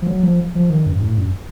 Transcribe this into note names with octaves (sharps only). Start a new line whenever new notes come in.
F3
F#3
F3
F3
D#3
F#2
F#2
A2
F#2